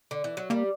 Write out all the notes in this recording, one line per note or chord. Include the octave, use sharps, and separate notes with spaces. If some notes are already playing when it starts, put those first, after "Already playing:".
D3
E3
F#3
G3 A#3